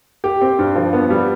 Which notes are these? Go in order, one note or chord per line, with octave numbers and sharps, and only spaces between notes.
G4
C4
G2
F3
B3
G3